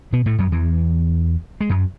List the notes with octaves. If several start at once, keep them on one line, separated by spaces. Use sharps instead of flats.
B2 B3
A2 A3
F#2 F#3
E2 E3
G#3
F#2 F#3